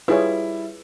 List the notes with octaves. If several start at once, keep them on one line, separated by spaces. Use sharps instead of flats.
G3 E4 F4 G#4 B4 C#5